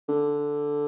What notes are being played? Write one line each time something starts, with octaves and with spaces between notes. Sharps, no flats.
D3